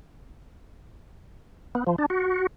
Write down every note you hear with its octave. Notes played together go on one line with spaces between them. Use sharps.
B3
F3
D4
F#4